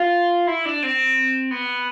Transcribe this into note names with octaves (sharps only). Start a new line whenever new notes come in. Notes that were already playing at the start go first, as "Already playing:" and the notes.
Already playing: F4
E4
D4
C4
B3